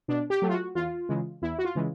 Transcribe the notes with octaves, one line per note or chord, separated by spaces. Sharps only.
B2 D4
G4
F#3 A3
F4
F#4
E2 F4
C#3 E3 G#3
E2 E4
F#4
F4
C#3 E3 G#3